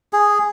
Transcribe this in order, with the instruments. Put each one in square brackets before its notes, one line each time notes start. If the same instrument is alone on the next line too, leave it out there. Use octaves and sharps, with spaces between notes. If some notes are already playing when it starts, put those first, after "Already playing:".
[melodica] G#4